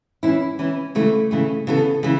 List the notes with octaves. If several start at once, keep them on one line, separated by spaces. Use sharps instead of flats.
E3 C#4 E4
E3 C#4 E4
C#3 E3 A3
C#3 E3 A3
C#3 E3 B3 A4
C#3 E3